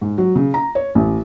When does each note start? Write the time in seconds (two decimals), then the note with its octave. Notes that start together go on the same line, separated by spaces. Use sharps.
0.01 G#2
0.18 F#3
0.35 C#3
0.54 A#5
0.75 C#5
0.95 A1